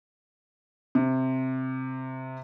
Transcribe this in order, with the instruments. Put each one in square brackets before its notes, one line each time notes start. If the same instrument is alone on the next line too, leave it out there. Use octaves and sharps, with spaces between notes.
[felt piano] C3